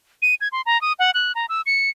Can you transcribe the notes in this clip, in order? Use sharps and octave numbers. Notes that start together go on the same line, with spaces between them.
D#7
G#6
C6
A#5
D#6
F#5
F#6
A#5
E6
C#7